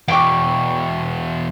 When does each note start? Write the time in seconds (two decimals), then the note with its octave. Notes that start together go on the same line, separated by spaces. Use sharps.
0.08 E2 B2 G5 C#6 D6